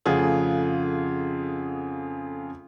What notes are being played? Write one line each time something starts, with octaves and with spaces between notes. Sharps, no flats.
F2 C#3 A3 F4 G#4 F#5